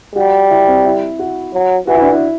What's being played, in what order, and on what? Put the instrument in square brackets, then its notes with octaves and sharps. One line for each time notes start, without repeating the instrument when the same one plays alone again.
[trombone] G3 [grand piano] F#4
[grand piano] E4
C4
E4
F#4
[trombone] F#3
[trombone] E3 [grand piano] F#4
[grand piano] E4
D4
E4